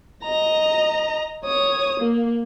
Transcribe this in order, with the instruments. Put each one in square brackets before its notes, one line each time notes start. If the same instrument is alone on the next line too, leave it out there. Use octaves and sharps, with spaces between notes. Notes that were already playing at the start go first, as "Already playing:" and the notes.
[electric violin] D#5 A#5
C#5 D#6
A#3